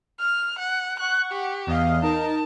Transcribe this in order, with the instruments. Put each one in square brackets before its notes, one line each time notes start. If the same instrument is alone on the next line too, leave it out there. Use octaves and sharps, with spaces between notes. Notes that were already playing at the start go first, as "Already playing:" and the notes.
[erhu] F6
F#5
[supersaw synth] F#5 C#6 [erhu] F#6
[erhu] G4
[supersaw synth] E2 D#5 F5
[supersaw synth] D#4 A#4 [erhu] A5